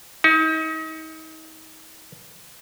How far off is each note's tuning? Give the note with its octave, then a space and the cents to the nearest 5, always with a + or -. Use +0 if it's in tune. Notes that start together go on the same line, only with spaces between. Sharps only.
D#4 +35